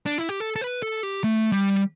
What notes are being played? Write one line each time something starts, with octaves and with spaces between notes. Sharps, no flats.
D4
E4
G4
A4
A4
B4
A4
G4
A3
G3